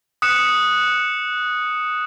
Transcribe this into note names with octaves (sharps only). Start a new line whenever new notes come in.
D#6 F#6 C#7 E7